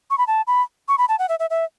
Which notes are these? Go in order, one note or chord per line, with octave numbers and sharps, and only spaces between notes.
C#6
B5
A5
B5
C#6
B5
A5
F#5
E5
E5
E5